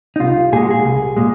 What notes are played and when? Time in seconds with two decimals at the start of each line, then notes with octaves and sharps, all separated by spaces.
0.16 D#4
0.20 C2 F4
0.52 A#2 G#3 G#4
0.62 F#4
0.71 G#4
0.85 C2
1.17 A#2 G#3